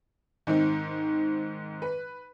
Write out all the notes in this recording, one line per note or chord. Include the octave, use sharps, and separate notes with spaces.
G#2 D#3 C4 D#4
B4